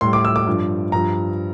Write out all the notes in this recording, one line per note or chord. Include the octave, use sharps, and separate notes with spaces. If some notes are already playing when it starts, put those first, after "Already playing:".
A2 G3 C6
D6
E6
D6
G2 F3
G2 F3 A#5